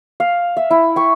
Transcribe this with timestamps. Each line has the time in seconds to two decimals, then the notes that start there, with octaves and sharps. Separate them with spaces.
0.20 F5
0.57 E5
0.71 E4
0.96 G5 C#6